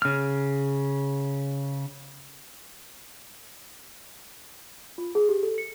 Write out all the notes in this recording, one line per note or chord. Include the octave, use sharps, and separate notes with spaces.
C#3 F6
F4
G#4
G4
A4
C#7